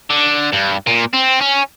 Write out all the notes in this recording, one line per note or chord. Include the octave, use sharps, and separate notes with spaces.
D3
G2
A#2
C4
C#4